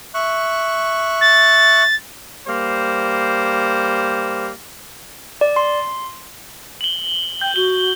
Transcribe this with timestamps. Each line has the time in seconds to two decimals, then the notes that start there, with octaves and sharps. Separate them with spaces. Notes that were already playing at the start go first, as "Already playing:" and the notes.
0.14 E5 C#6 F#6
1.21 A6
2.48 G3 A#3 C5
5.41 D5
5.56 C6
6.81 F#7 G7
7.41 G5 G6
7.56 F#4 G7